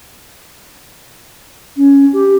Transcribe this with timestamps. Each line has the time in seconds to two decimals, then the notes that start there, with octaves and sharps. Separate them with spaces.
1.77 C#4
2.13 G4